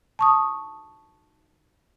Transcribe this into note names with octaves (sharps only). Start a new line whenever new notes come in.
A5 C#6 D#6